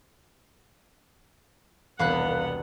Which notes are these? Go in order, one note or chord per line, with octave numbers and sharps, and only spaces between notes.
E1 C2 B3 F5 F#5 B5 F#6